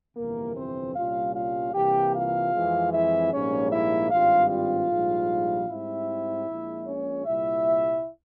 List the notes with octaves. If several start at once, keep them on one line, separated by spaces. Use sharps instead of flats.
G1 F2 C3 E3 A#3 A#4
C4 C5
C2 A#2 G3 C#4 F4 F5
F4 F5
C2 C3 E3 A#3 G4 G5
F4 F5
F2 E3 G#3 C4
E4 E5
A#1 G#2 G3 A#3 C#4 C#5
E4 E5
G#1 G2 G3 C4 F4 F5
F4 F5
A#1 G#2 G3
G#2 G3 C4 E4 E5
A#1 A#2 G#3
C#4 C#5
C2 A#2 G3 E4 E5